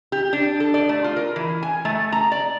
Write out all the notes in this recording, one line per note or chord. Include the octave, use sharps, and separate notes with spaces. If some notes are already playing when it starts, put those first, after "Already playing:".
G4
D4
A4
D5
A3
F4
A#4
E3
G#5
A3
A#5
D5